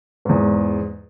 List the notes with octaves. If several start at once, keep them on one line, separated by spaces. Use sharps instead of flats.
E2 G#2